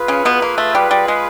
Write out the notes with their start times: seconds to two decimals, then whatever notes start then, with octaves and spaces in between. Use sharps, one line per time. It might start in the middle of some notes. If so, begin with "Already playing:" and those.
Already playing: F4 G#4 B4
0.08 C#3 C#4
0.25 B2 B3
0.42 A#3
0.58 A3
0.75 G3
0.91 G3
1.08 G#3